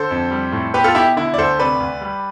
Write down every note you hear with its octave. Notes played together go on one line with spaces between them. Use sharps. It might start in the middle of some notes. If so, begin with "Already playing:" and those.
Already playing: D3 A4 C5
F2
G3
A2
B3 G4 B4
F4 A4
B2 E4 G4
D3 E4
D5
D2 A4 C5
C3 B4 D5
D2
G3